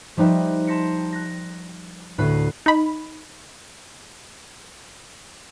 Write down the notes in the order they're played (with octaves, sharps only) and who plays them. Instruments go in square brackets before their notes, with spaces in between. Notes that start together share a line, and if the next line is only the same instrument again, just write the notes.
[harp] F3 G3 D#4 B4 E5
A5 C6 G6 A#6 B6 C#7
F#6 A#6
D2 A2 B4 B5 C7
[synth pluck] D#4 B5